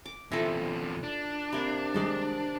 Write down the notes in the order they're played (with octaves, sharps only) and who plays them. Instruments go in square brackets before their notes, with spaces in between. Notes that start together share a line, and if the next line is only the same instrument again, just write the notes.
[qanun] D6
[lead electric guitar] E2 C3 [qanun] E4 F4 A4 [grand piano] A#6
[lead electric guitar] D4
[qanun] C3 A#3 [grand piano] B5
[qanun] D#3 C5 D5 [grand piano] G3 G#3 D#6